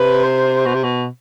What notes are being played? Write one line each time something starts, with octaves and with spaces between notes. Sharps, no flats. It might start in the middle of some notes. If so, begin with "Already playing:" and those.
Already playing: C3 B4
C5
B2
C3
B2